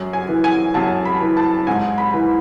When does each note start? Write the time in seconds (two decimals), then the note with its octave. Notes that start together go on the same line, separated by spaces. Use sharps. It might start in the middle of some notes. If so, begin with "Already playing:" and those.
Already playing: F#2
0.13 G#5
0.28 E3
0.44 G#5
0.74 F#2 A5
1.05 B5
1.21 E3
1.37 A5
1.67 G#2 G#5
1.98 B5
2.14 E3